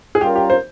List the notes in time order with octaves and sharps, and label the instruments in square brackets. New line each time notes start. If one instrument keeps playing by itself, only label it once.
[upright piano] G#4
[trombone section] G3 C#4 F4 A#4 [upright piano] G4
[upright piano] G4
C5